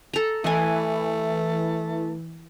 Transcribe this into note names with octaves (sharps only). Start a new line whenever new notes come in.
A4 A#5
E3 A3 D#5 G#5